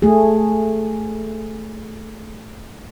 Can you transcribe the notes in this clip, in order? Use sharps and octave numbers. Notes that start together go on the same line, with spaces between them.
A3 G#4